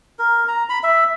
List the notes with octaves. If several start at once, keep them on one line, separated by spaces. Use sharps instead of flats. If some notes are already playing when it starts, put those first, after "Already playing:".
A#4
A#5
B5
E5